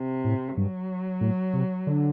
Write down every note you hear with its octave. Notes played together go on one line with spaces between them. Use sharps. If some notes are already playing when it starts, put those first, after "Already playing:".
Already playing: C3
A2
G2 F#3
A2
C3
D3